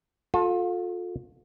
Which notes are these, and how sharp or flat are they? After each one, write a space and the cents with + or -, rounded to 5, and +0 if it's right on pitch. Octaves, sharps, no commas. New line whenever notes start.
F4 +35 A4 -5